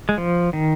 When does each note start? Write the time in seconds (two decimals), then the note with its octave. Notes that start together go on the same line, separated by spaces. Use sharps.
0.09 G#3
0.18 F3
0.53 D#3